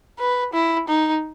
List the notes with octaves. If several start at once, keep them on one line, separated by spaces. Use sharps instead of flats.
B4
E4
D#4